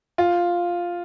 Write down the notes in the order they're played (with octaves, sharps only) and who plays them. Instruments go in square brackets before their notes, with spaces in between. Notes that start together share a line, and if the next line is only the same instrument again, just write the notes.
[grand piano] F4